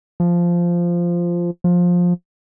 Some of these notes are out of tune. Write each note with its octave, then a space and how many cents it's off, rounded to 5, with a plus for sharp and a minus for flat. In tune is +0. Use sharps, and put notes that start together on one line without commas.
F3 -10
F3 +15